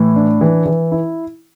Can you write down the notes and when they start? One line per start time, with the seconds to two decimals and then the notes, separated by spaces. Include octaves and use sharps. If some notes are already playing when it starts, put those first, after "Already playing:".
Already playing: A2 E3
0.16 D4
0.41 E3
0.66 E3
0.92 E4